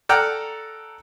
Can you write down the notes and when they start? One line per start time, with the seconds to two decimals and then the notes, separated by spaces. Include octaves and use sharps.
0.09 A4 D5 F#5 G5 A#5 F6